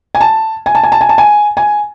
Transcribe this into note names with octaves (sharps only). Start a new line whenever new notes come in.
G#5
A5
G#5
A5
G#5
A5
G#5
A5
G#5
G#5